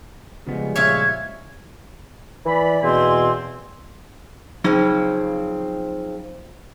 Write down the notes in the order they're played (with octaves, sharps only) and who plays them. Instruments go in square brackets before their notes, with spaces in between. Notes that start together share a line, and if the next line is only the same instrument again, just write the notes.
[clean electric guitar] C#3 B3 [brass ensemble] F3 G3 G#3
[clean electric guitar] A#2 C#3 F4 [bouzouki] C#5 E5 F5 [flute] G#6
[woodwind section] E3 D5 B5
E2 B2 C4 G#5 C6
[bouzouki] C#3 F3 C4 [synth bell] F#3 D#4